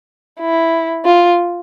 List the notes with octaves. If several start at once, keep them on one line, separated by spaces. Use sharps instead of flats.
E4
F4